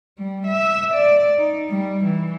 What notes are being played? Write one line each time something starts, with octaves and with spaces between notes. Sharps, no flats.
G3
E5
D5
D#4
G3
E3